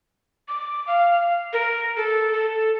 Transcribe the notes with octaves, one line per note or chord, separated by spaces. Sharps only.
D6
F5
A#4
A4
A4